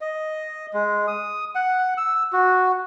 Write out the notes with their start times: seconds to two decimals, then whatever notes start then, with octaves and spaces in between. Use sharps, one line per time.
0.01 D#5
0.73 G#3
1.07 D#6
1.55 F#5
1.97 E6
2.33 F#4